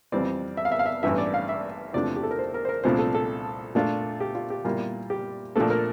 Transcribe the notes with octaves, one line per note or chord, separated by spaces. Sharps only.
F2 E3 G3 C4 D5
E5
F5
E5
F5
E5
A1 G2 E3 E5
D5
F5
E5
E2 C3 F3 A3 D4 D5
G4
A4
A#4
C5
A#4
C5
A#4
C2 A#2 F3 A3 D4 C5
A4
A4
A#2 A3 D4 F4
G4
F4
G4
A#2 G3 A#3 E4 F4
G4
A#2 F3 A3 D4 A4
A#4